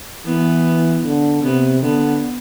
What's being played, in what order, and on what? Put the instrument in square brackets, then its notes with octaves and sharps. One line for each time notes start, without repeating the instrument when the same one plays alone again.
[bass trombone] E3 [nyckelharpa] B3
[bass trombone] D3
[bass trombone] C3 [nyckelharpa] B3
[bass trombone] D3 [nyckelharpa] B3